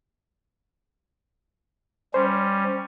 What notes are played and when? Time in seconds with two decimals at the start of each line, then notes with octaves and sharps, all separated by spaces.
2.14 G3 C#4 C5